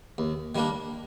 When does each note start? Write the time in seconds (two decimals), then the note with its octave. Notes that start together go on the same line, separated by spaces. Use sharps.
0.18 D#2
0.55 D#3 G3 A#3 D4